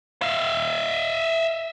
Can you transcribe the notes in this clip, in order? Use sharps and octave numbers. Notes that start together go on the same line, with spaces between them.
E5 F5